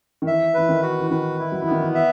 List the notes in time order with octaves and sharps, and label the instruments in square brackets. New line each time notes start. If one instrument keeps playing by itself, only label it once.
[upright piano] D#3
[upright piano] E3 [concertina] E5
[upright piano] E3 [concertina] B4
[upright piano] D#3
[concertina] F#4
[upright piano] E3
[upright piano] D#3 [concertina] B4
[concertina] E4
[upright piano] F#3
[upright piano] E3 [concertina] B3
[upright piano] D#3
E3
[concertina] E5